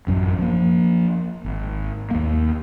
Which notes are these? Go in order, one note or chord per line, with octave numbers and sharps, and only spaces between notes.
A1 F#2 F#3
F3 A#3
G#1
D#2 A#3